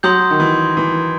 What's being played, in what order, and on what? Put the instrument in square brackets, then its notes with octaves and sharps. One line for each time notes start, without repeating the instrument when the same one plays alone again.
[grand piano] F#3 [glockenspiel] C6 D#6 G6
[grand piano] D#3
E3
E3